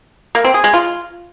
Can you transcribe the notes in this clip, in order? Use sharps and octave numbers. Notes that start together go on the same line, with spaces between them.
A#3
C4
G#4
G#3
F4